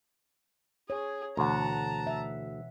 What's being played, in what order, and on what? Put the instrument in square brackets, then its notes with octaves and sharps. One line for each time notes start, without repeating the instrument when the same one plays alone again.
[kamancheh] G#4 [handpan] C#5
[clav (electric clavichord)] D2 [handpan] B2 E3 F#5 [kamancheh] A5 A#5
[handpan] E5